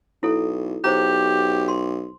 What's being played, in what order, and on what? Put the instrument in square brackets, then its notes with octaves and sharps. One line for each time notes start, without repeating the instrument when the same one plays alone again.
[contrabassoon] B1 [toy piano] E4 A4
[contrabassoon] B1 [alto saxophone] G4 [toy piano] G#4 C5 A#5
[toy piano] C6